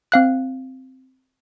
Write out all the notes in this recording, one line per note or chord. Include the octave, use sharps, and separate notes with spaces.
C4 F5 F#6